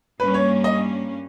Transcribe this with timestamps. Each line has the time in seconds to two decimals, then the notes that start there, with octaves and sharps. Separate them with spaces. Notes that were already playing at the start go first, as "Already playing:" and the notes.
0.20 G2 G3 A#3 C#4 B4
0.34 C#5
0.64 D#5